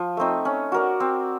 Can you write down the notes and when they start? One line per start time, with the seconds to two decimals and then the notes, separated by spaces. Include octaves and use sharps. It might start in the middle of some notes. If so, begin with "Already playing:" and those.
Already playing: F3
0.17 A3 C4 D#4
0.45 C#4
0.72 F#4 A#4 D5
1.00 C4